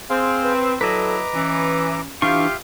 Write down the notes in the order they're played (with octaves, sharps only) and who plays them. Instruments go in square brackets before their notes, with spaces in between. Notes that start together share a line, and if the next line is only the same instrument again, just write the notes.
[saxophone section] C4 [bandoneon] G#4 C5 F5
[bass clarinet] B4
[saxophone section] F#3 E4 [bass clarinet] A4 [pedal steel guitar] B4 D#5 [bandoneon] A#5 D6
[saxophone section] E3 [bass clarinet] C#4
[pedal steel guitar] E3 D4 C#6 [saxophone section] F4 G4 [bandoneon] E5 F5